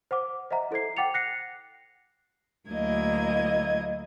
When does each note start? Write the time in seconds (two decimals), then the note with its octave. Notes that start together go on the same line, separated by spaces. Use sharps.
0.11 C5 F#5 D6
0.51 C5 D#5 E5 F#5 A#5
0.71 E4 A4 C5 G#6 C7
0.97 F#5 G5 D6 A6 C#7 F7
1.14 F#6 A#6 C7 C#7
2.70 D2 F#3 A#3 E4 D#5 G#6